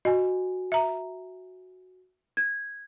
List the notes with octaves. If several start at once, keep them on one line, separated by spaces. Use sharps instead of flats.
F#4 D#5 G#5
E5 A#5
G#6